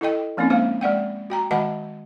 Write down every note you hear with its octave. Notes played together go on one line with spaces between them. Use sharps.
E4 A4 D#5 G5
F3 A#3 C4 C#4 D#4
G#3 A#3 C5 F5
G#3 D5 F#5 G5
F#4 G5 A#5
D#3 G#3 F#4 D#5 F#5 A5